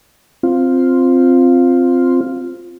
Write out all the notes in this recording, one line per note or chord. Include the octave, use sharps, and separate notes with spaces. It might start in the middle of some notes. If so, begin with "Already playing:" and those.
C4 F4